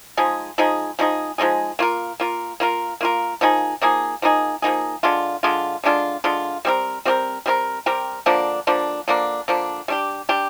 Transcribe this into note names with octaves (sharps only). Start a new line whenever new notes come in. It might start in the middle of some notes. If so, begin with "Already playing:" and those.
F3 G#3 D#4 G#4
F3 G#3 D#4 G#4
F3 G#3 D#4 G#4
F3 G#3 D#4 G#4
A#3 F4 A#4
A#3 F4 A#4
A#3 F4 A#4
A#3 F4 A#4
F3 A#3 D#4 G#4
F3 A#3 D#4 G#4
F3 A#3 D#4 G#4
F3 A#3 D#4 G#4
D3 G#3 D4 F4
D3 G#3 D4 F4
D3 G#3 D4 F4
D3 G#3 D4 F4
G3 C4 G4 A#4
G3 C4 G4 A#4
G3 C4 G4 A#4
G3 C4 G4 A#4
D3 F3 A#3 D4
D3 F3 A#3 D4
D3 F3 A#3 D4
D3 F3 A#3 D4
G3 D4 G4
G3 D4 G4